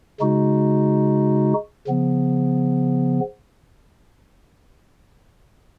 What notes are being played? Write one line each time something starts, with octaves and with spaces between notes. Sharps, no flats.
C#3 G#3 D#4 F#4
C#3 F3 B3